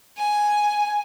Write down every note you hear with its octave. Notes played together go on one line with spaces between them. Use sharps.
G#5